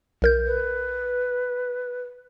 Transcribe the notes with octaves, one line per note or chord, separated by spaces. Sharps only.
B1 A#4 G6
B4